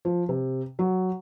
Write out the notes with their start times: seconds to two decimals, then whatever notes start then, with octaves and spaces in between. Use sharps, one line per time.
0.05 F3
0.29 C3
0.79 F#3